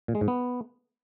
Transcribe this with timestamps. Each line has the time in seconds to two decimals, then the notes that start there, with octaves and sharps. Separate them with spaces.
0.08 A#2
0.15 G#3
0.21 G#2
0.28 B3